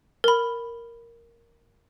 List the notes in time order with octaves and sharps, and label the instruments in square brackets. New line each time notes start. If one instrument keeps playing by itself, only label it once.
[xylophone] A#4 B5